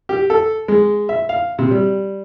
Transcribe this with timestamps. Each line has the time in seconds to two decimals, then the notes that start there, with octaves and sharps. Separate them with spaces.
0.09 G4
0.30 A4
0.68 G#3
1.09 E5
1.29 F5
1.59 C3
1.71 G3